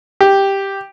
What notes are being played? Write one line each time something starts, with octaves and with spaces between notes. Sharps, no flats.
G4